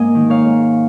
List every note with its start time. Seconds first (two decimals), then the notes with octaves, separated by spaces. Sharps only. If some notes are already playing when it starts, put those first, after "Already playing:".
Already playing: G#2 A#3 D#5 F5 G#5
0.15 D#3
0.30 C#5 F5
0.46 G#2